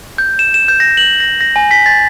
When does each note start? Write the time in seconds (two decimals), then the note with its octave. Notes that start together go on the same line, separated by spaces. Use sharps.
0.18 G6
0.39 E7
0.54 E7
0.68 G6
0.80 A#6
0.97 F#7
1.20 A#6
1.41 A#6
1.56 G#5
1.71 B6
1.86 A6